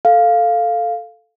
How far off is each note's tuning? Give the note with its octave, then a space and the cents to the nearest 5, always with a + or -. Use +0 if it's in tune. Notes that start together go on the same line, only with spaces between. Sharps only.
A4 +0 F5 +0